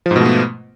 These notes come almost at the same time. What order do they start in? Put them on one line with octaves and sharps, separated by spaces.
F3 G#2 B2 A3 B3